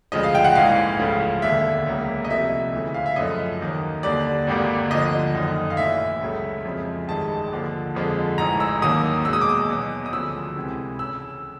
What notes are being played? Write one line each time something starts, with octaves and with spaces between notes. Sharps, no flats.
D2 C#3 F3 G#3 D#5
F5
G5
F#5
A#1 G#2 E3 F5
C#2 C#3 F3 A3
E1 D#2 D3 E5
C#2 C#3 F#3 A#3
D#5
C2 C3 F3 A3 E5
D2 C#3 E3 A3
F5
E5
F#2 C#3 F3 A3 D#5
D#2 D#3 F#3 A#3
D#2 D3 G3 D5
G#1 G2 D3 G3 A#3
D2 D3 F3 D#5
F#1 F#2 D#3
F5
A#1 A2 E3 E5
C#2 C#3 F#3 A3
F2 C#3 F3 G#3
A1 G2 D#3 G#3 A5
D#2 D3 F3
F2 D3 F3 G#3
A1 G#2 E3 A#5
E6
D#2 D#3 F#3 A#3 D#6
E2 B2 G#3 E6
D#6
D6
D#6
E2 B2 F#3
D#6
D2 C#3 F3 E6
C#2 C3 E3
C#3 E6